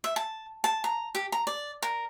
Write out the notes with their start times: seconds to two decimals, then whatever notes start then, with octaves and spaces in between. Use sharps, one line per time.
0.04 E5
0.16 A5
0.64 A5
0.84 A#5
1.15 G4
1.32 A#5
1.47 D5
1.82 A#4